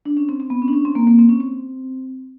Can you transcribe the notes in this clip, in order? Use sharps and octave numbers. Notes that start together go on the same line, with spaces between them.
D4
C#4
C4
C4
B3
C#4
D4
C#4
C4
A#3
A#3
C4
C#4
C4